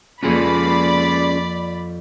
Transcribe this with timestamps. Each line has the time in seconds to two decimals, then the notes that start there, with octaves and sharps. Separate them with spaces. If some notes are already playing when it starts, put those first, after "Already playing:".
0.23 F2 A#3 C#4 F4 G#4 D5 G#5 B5